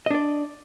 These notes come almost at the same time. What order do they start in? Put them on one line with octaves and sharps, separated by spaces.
D#5 D4 D5